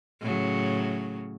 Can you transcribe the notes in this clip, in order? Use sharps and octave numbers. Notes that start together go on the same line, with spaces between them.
A2 C#3 F#3